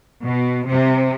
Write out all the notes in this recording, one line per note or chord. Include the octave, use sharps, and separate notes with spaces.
B2
C3